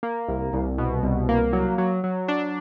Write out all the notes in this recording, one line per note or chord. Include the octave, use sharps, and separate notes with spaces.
A#3
C2
C2
B2
C2
A#3
F#3
F#3
F#3
D4